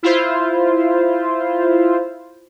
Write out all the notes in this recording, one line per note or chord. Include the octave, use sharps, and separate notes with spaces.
E4 F4 C5